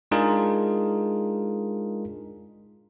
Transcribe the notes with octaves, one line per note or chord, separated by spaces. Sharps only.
G#3 D4 D#4 F4 G#4 A#4